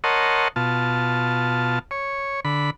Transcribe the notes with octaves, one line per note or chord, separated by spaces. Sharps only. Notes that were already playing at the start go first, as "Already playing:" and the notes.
A#4 C#5 D#5 F#5 A5 C6
B2 F4 A5
C#5
D3 B5